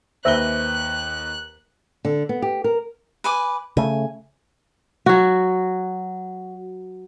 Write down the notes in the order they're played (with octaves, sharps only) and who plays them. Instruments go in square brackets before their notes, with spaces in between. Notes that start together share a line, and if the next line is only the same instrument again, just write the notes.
[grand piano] D#2 B4 G7 [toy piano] C5 E5 E6 [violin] F#6
[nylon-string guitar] D3
B3
G4
A#4
[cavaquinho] B4 G#5 D6
[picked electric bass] C#3 A3 [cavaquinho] G#5
[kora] F#3 F#4